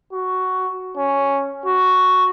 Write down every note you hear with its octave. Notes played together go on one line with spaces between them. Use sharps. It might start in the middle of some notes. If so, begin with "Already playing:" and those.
F#4
C#4
F#4